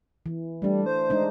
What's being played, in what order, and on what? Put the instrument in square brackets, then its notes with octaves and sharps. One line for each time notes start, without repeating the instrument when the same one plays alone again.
[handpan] E3
[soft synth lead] G3 [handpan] A3 D4
[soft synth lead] C5
[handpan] G#3 D4 D#4